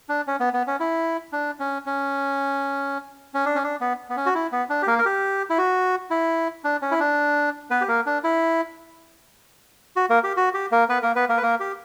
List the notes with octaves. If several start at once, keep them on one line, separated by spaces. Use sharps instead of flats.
D4
C#4
B3
B3
C#4
E4
D4
C#4
C#4
C#4
D4
C#4
D4
B3
B3
C#4
F#4
E4
B3
D4
G4
A#3 A#4
A#4
G4
E4
F#4
E4
D4
C#4
E4
D4
B3 B4
G4
A#3 A#4
D4
E4
F#4
A#3 A#4
G4
F#4
G4
A#3 A#4
B3 B4
A#3 A#4
B3 B4
A#3 A#4
B4
A#3 A#4
G4